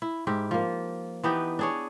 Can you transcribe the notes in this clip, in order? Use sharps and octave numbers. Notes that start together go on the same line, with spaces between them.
E4
G#2 E4 G4
F3 A#3
E3 B3 D#4 G4
D4 G#4 C#5